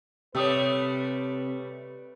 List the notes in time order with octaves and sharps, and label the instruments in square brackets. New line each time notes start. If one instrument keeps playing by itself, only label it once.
[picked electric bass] C3 [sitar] G3 A3 [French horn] B4 [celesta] C#5 D#6 E6